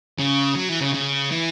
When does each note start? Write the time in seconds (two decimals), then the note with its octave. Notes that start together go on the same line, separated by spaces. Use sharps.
0.19 C#3
0.56 F#3
0.69 E3
0.81 C#3
0.94 C#3
1.31 E3